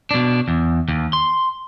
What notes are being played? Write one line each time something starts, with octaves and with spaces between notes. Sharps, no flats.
B2 D4
E2
D#2
C6